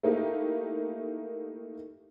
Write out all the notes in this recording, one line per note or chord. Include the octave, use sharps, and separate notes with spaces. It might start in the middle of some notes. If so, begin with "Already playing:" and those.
A3 A#3 D#4 E4 G4